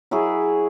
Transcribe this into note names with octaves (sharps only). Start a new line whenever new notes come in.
F#3 E4 G#4